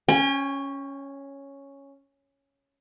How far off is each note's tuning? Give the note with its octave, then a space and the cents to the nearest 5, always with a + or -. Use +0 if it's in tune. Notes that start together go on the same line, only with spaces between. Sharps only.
C#4 +0 G5 +45